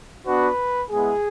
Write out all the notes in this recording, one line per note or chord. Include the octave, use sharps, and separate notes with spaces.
B3 D4 F#4 B4
G#3 B3 E4 G#4